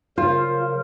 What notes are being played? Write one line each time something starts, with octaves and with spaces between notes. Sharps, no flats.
C#3 F#3 F4 A#4 C5